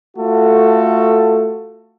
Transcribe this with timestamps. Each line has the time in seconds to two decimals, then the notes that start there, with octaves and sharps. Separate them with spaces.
0.17 A3 F4 F#4 A4